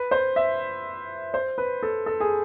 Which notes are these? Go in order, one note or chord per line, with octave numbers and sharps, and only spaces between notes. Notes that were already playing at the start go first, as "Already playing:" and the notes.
Already playing: B4
C5
E5
C5
B4
A4
A4
G#4